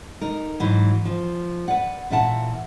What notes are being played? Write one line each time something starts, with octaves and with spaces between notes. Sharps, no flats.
D#4 A#4
G#2 E3 F#3
F3
B4 D5 F#5
A#2 E3 E5 F#5 A5